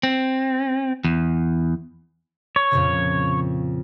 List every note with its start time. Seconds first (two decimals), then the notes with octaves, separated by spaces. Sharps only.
0.03 C4
1.05 E2
2.56 C#5
2.71 F2 A#2 C#3